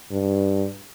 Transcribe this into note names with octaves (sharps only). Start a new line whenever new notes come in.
G2